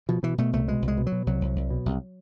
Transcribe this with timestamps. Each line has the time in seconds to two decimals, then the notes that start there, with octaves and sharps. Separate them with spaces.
0.09 B2 F3
0.23 B2 E3
0.38 B2 A3
0.53 C2 A3
0.68 B2 G#3
0.82 C2
0.88 G#3
0.97 B2
1.07 F#3
1.12 B2
1.27 C2 F#3
1.41 C2
1.56 C2
1.70 B2
1.86 C2